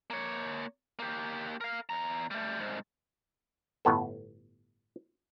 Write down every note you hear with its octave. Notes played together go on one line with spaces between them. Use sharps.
A#3 C#5
A#3 G4
A#4 F5
E2 A#5
G3 A3
C2 G#2
G1 A2 B3 A4